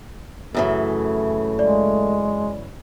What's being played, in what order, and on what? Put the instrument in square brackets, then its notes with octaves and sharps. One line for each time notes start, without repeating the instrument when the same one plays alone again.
[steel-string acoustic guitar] F#2 C#3 E3 [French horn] A3
[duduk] G#3 [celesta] D5